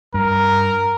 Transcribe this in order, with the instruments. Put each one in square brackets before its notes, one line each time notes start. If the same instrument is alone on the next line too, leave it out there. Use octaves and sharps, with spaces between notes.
[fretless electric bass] G2 [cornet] A#4